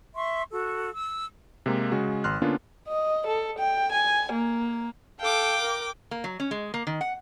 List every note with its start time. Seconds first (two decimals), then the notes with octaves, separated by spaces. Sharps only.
0.14 E5 C6 C#6
0.51 F#4 A4
0.92 E6
1.66 C3 G#3 A#3
1.91 C#3 G#3 F#4 G#4
2.24 G#1 C6 F6 F#6
2.42 D3 A#3 B3 C#4 D4 F4
2.88 D#5
3.27 A4
3.59 G5
3.92 G#5
4.32 A#3
5.20 A4 F5 G5 D6
5.62 A#4
6.11 A#3
6.24 F#3
6.40 C#4
6.51 G#3
6.74 A#3
6.87 D#3
7.01 F#5